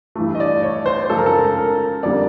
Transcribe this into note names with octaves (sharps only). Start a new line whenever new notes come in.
G2 E3 A3
D#5
D5
C#5
C5
F#2 C#3 F3 G#3 A4
A#4
A4
A#4
F2 D3 G3 A#3 D5